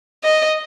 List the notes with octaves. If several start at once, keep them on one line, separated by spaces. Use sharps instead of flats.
D#5